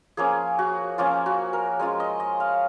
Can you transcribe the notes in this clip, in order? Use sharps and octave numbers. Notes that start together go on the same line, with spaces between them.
F3 A#3 C#4 G#4
F#4
F3 A#3 C#4 F4
F#4
A#4
G#3 C#4 F4
D#5
D#5
F5